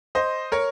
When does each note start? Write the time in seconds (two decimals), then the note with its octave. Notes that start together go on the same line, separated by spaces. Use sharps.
0.15 C5 D#5
0.52 A#4 C#5